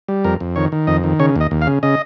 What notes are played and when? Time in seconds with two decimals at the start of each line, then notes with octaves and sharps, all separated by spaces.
0.08 G3
0.24 F2 A#4
0.40 F2
0.56 D#3 C#5
0.72 D#3
0.87 F2 D#5
1.04 D#3
1.20 C#3 C#5
1.36 D#2
1.41 D#5
1.51 D#2
1.62 F5
1.67 C#3
1.83 C#3 D#5